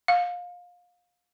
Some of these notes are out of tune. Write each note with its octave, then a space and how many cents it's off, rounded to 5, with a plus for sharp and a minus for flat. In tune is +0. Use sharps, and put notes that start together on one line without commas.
F5 +25